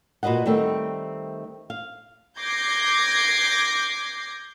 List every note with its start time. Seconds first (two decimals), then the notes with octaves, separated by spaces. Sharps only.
0.23 A#2 F#4 B4 D#5 F#5
0.46 D#3 G3 A3 C4
1.70 F5
2.39 D6 G6 G#6 A#6 C7